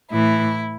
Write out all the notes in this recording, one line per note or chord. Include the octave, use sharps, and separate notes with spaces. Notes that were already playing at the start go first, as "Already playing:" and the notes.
A2 E3 E4